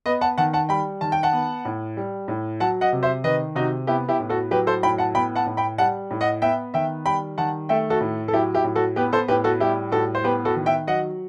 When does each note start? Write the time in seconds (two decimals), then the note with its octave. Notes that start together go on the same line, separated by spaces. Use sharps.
0.06 B3 B4 D#5
0.21 F#5 A5
0.38 D#3 F#5 A5
0.53 F#5 A5
0.69 G3 G5 B5
1.01 D#3 A5
1.12 G5
1.23 F#5 A5
1.33 B3
1.65 A2
1.97 G3
2.28 A2
2.60 F#3 F#5 A5
2.81 D#5 F#5
2.93 C3
3.03 C5 E5
3.24 D#3 B4 D#5
3.55 C3 D#4 F#4
3.87 B3 E4 G4
4.09 E4 G4
4.20 A2
4.29 F#4 A4
4.51 F#3 G4 B4
4.67 A4 C5
4.83 A2 G5 B5
4.98 F#5 A5
5.15 B3 G5 B5
5.36 F#5 A5
5.46 A2
5.57 G5 B5
5.78 G3 F#5 A5
6.11 A2
6.21 D#5 F#5
6.42 B3 E5 G5
6.74 D#3 E5 G5
7.06 G3 G5 B5
7.38 D#3 F#5 A5
7.69 A3 E5 G5
7.90 F#4 A4
8.01 A2
8.28 A4
8.33 F#3 E4 G4
8.54 E4 G4
8.64 A2
8.76 F#4 A4
8.96 B3 G4 B4
9.13 A4 C5
9.28 A2 G4 B4
9.44 F#4 A4
9.60 G3 E4 G4
9.92 A2 F#4 A4
10.15 C5
10.24 B3 G4 B4
10.45 F#4 A4
10.56 D#3
10.66 E5 G5
10.87 F#3 D#5 F#5